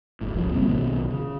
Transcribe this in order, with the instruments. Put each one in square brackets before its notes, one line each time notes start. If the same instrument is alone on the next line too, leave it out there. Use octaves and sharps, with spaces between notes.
[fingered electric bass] G1 A2
G1 C#2 G#2 F3
C#3 G3 A#3 C4
B1 B2 D#3 F#3
C#3